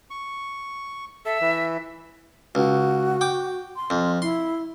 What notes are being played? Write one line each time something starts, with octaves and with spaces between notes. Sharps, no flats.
C#6
A4 E5
E3
C#2 F#4
G5 D6
C6
F2
E4 C6